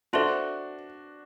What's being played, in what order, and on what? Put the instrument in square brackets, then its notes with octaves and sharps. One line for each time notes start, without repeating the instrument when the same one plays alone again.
[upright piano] D4 F#4 [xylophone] A4 C5 E5 A5 C6